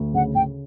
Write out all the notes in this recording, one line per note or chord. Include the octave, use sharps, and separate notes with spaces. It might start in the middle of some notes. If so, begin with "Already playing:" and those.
Already playing: D2
C#3 F#5
C#3 G5